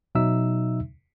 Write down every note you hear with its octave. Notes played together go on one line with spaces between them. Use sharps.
B2 F#3 D#4 E5 E6